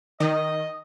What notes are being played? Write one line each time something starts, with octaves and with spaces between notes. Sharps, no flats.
D#3 D#5